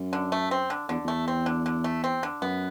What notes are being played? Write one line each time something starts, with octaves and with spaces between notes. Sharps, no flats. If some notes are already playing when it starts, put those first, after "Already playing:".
Already playing: F#2
D3
A3
C4
D3
E2 D3
E2 A3
C4
D3
D3
A3
C4
D3
F#2 B3